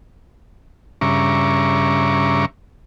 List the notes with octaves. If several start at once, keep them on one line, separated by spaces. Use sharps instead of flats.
G2 C#3 E5 A#5 C#6 D6